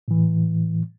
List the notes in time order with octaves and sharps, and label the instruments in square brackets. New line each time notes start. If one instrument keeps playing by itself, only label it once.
[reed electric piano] A2 E3